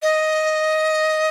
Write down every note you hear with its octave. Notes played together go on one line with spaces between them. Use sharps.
D#5